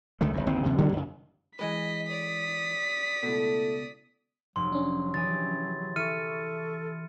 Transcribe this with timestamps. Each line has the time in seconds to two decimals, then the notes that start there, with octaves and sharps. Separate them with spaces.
0.21 C#2 D3 D#3 A3
0.34 F#1 E2
0.46 G1 D#2 C#3 C4
0.65 D#2 C3 F3
0.78 C#3 F#3 A#3 D4
0.92 F#2 C#3
1.59 E3 G#3 B4 D#5 B6
2.08 D5 D#6
3.23 C#2 B2 A3 E4 A4
4.56 F1 F#3 C6
4.72 C#4 D4
5.14 E3 G4 G#4 A6
5.96 E3 A4 E5 C#6 F6 C#7 D#7